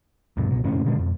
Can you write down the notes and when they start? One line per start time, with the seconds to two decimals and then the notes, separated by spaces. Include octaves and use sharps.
0.37 D2 G2 B2
0.49 C2 B2
0.64 F#1 F2 A2 C#4
0.85 B2 D3 G#3
0.99 F2